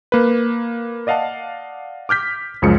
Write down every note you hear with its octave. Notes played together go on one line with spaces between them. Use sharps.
A#3 B4
D5 D#5 F5 F#5 A5
D6 F6 G6 B6
C#2 F#2 F3 G#3 C#7